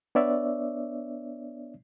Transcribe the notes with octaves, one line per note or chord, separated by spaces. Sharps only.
B3 D4 C#5 D5 E5